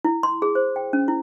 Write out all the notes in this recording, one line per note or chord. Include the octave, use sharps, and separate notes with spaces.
E4
C6
G#4
C5
G5
C#4
E4